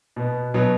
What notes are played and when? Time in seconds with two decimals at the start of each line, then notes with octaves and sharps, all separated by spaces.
0.16 B2 B3
0.54 B2 F#3 B3